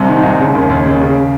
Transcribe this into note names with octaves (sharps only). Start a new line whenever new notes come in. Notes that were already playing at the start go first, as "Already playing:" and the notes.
Already playing: C2 C3 C5
D#3
C2
C#3
D#2
D#2
C#3
C#3